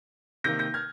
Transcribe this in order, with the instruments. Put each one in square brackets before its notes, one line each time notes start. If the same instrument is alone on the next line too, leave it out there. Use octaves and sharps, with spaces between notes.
[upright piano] C3 D#3 A#3 G6 A#6
G6 A#6
F6 G#6